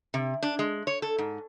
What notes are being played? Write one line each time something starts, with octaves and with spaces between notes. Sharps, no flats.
C3
D4
G#3
C#5
A4
G#2